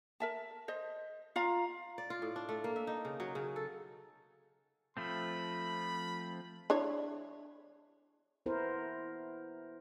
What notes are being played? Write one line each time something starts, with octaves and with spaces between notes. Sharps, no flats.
A#4 E5 A5
C5 D#5
F4 F5 A#5
D5
F4
A2
D4
A3
A#3
E5
D#4
C#3
F#3
C#3
A4
F3 A3 C4 B5
D4 E4 C#5
B3 E4 A#4 C5